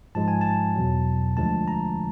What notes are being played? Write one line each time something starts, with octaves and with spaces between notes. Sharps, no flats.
G#2 F3 G#3 A5
G#5
A5
E2 B2 F#3
D2 D3 F3 G#3 A5
A#5